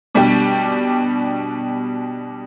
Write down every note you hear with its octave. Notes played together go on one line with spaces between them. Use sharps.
B2 G3 D4 G4